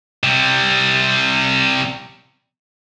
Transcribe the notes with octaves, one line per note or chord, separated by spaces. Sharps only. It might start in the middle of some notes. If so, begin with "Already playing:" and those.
C3 G3